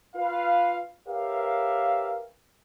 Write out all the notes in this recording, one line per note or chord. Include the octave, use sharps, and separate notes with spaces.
F4 B4 F5
G4 A#4 B4 C#5 E5 F5